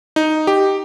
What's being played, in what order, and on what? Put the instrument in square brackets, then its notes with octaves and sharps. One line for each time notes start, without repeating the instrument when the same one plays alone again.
[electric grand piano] D#4
G4